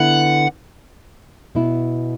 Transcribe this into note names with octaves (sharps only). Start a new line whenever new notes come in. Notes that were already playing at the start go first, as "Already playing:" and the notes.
Already playing: D3 B3 E4 F#5
B2 B3 E4